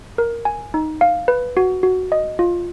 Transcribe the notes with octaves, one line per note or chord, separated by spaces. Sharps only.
A#4
G#5
D#4
F5
B4
F#4
F#4
D#5
F4